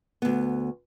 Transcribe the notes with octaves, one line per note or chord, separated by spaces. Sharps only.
D2 B3